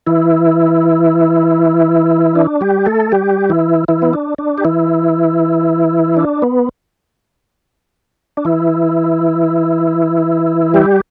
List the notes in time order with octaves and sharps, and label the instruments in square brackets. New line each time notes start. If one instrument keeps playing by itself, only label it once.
[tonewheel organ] E3 E4
D4
G3 G4
A3 A4
G3 G4
E3 E4
E3 E4
B3
D4
D4
G4
E3 E4
D4
B3
D4
E3 E4
G3 G4